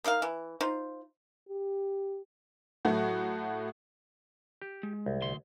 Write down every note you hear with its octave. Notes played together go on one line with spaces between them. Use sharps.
A#3 D#4 A#4 F5
E3
D#4 F4 C5
G4
A2 F#3 A3 F#4
G4
G#3
C2
D2 C6